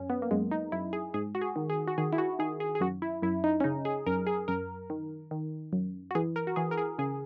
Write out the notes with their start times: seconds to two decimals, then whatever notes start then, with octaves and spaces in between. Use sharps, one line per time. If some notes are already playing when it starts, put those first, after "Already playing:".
Already playing: F#2 C#4
0.10 B3
0.22 A#3
0.31 F#2 G#3
0.51 D#4
0.72 F#2 E4
0.93 G#4
1.14 G#2 G#4
1.35 F#4
1.42 G#4
1.56 D#3
1.70 G#4
1.88 F#4
1.98 D#3 G#4
2.13 E4
2.18 F#4
2.39 D#3 G#4
2.60 G#4
2.75 G#4
2.81 F#2 F#4
3.02 E4
3.22 F#2 E4
3.44 D#4
3.60 C#4
3.64 C#3 D#4
3.85 G#4
4.06 F#2 A#4
4.27 G#4
4.48 F#2 A#4
4.90 D#3
5.31 D#3
5.73 F#2
6.11 F#4
6.15 E3 G#4
6.36 A#4
6.47 F#4
6.56 E3 G#4
6.71 A#4
6.78 G#4
6.99 C#3 G#4